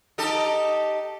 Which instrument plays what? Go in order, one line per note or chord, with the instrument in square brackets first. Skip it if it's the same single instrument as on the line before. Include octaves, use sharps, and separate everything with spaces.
[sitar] D#4 G4 A4